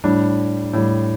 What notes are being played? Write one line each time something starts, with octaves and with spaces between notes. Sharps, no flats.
A2 G3 D4
A2 G3